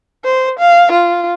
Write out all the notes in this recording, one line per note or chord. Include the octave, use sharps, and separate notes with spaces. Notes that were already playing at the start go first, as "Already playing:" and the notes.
C5
F5
F4